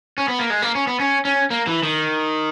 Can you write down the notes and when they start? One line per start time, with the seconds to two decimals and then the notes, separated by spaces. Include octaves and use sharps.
0.18 C#4
0.28 B3
0.39 A#3
0.50 G#3
0.62 A#3
0.75 C#4
0.87 B3
1.00 C#4
1.25 C#4
1.50 A#3
1.67 E3
1.83 D#3